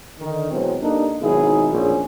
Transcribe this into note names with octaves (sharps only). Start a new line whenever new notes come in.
D3 D#3
B2 E3 F#3 G#3 C4
A#3 D4 D#4 G4 A4
G#1 B2 F#3 D#4 E4 G#4
A#1 E2 C#4 G#4